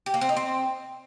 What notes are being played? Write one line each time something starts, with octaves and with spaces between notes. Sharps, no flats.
G4
A#3
C4
D#4
C4